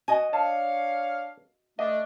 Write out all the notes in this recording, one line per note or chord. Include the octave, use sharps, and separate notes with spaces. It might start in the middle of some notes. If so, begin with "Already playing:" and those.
F#4 D#5 G#5
D4 C#5 F5 A5
A3 D4 D#5